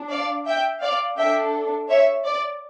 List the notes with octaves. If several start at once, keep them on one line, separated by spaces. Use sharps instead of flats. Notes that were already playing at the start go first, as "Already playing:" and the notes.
Already playing: D4
D5 F5
E5 G5
D5 F5
D4 A4 E5 G5
C#5 E5
D5